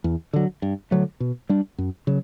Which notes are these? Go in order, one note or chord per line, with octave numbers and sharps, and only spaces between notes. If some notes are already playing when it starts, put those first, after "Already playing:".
E2
D3 F#3
G2
D3 F#3 A3
B2
G3 D4
F#2
C#3 F#3